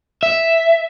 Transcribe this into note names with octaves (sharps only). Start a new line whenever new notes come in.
E5